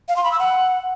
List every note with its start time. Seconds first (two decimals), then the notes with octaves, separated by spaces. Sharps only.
0.09 F5
0.16 C6
0.24 B5
0.32 E6
0.39 F#5